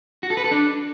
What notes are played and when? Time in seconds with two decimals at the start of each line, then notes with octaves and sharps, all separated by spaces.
0.23 F#4
0.30 A4
0.37 B4
0.44 A4
0.51 D4